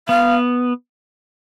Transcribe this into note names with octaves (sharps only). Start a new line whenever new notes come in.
B3 F5